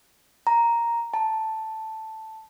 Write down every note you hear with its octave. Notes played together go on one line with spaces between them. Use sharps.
A#5
A5